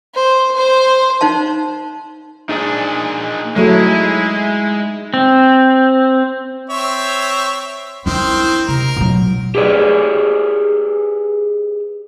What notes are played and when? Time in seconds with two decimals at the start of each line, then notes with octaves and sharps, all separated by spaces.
0.15 C5
0.56 C5
1.21 D#4 C5 F5 A5
2.49 A#2 D4 D#4 G#4 D#5
3.56 F#3 G#3 A3 E4
5.14 C4
6.70 C4 C#5 E5
8.06 D#3 C4 D4 E4
8.68 C3 A#4
8.97 B2 F#3
9.55 G4 G#4 B4 D5